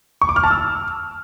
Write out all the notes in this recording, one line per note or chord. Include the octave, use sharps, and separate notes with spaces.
C#6
D6
F6
A5
E6